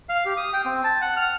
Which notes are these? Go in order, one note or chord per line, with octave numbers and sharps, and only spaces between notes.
F5
G4
D#6
G5
C4
A5
F#5
F6